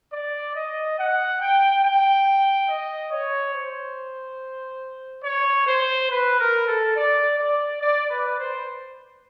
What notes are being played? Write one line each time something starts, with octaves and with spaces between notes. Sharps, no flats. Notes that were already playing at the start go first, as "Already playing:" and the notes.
D5
D#5
F#5
G5
G5
D#5
C#5
C5
C#5
C5
B4
A#4
A4
D5
D5
D5
B4
C5